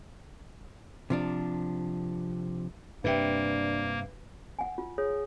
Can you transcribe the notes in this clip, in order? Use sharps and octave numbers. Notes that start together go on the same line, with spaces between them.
C3 F3 D4
G2 C3 A#3 D4 B4 E5 G5
F#5 G#5
F4
G#4 C#5